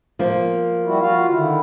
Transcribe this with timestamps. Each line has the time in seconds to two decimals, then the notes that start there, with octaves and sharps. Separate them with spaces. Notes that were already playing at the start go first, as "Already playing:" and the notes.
0.19 F3 A#3
0.85 G3 E4 F#4
1.00 F4 F#4 F5
1.30 D3 D#3 E4